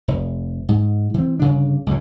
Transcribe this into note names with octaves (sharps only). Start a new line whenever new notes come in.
F1
G#2
E3 C4
G1 C#3 D4
C#2 F#2 A2